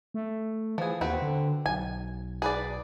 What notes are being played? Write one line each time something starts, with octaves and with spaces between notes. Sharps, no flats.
A3
E3 F3 G#4
D#2 C4 F#4 B4
D3
B1 G#5
G#4 B4 D5